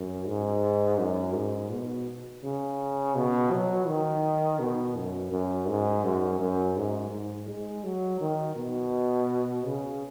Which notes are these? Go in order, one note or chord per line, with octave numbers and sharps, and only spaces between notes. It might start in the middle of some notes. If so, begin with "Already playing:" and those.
Already playing: F#2
G#2
F#2
G#2
B2
C#3
B2
F#3
D#3
B2
F#2
F#2
G#2
F#2
F#2
G#2
G#2
G#3
F#3
D#3
B2
C#3